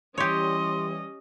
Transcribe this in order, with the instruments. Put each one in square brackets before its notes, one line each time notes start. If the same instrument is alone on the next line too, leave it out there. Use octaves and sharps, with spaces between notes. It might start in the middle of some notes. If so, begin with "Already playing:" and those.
[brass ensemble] E3 G3 [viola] C#4 D#5 [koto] G4 C#5 [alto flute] C6